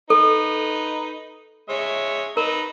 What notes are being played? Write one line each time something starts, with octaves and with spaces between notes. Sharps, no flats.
D#4 A4 B4
G#3 C#5 E5
D#4 A#4 B4 A#5